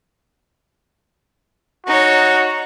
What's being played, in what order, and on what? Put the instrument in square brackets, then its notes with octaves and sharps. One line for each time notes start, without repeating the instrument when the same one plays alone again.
[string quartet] D#4 C#5 [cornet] F#4